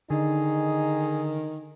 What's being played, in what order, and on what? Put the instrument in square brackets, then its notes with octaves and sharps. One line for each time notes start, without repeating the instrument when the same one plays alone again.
[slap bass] D3 [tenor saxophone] D#3 [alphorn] D#4 [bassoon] G#4